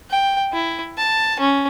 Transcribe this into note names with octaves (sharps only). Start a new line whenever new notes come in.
G5
E4
A5
C#4